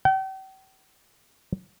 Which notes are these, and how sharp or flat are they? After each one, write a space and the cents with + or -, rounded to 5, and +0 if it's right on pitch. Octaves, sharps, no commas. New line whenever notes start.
G5 -40